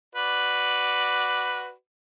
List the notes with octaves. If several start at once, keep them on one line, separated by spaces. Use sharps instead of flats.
F#4 B4 D5